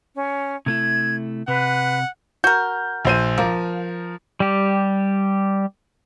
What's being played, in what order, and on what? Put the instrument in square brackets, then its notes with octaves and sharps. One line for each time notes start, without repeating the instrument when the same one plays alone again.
[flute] C#4
[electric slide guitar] C3 A3 E4 [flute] G#6
[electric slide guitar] C3 [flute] B4 [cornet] F#5
[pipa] F#4 A#4 [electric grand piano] G6
[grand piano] A#1 C5 D#7
[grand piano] F3 A#4 [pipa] A#3
[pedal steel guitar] G3 G4